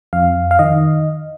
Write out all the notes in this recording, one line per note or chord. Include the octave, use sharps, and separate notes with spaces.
F2 F5
F5
D#3 D#5